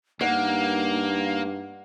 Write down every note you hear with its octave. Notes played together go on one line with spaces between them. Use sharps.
G2 A#3 D#4 F#5